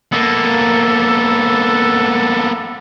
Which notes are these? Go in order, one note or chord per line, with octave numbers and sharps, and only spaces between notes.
A#3 B3 A4